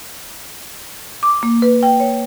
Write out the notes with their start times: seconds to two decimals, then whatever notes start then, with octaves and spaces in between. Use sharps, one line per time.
1.23 D6
1.43 A#3
1.62 B4
1.83 G5
2.00 C#5